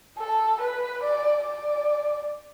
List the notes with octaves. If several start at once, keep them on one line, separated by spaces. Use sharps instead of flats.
A4
B4
D5
D5